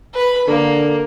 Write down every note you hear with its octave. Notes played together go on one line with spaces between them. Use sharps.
B4 B5
D3 A#3